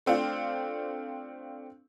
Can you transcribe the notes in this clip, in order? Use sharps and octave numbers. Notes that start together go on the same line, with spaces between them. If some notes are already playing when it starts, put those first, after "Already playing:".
A3 C4 D4 F4